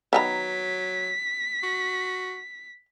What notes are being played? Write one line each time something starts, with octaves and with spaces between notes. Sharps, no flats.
D#3 F#3 B3 A#5 B6
F#4